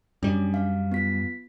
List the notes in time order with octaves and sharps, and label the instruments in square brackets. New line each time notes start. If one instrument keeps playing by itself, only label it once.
[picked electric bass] F#2 G3 [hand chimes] C#4 D4
[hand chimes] F5
B3 F4 B6